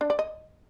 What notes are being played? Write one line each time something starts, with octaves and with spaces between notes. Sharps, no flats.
D4
D5
D#5